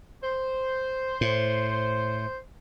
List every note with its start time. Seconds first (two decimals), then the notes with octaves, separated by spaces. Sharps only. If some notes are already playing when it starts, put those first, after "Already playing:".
0.23 C5
1.21 A2